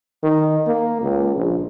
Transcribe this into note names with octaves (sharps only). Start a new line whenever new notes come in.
D#3
A#3
C#2
A#1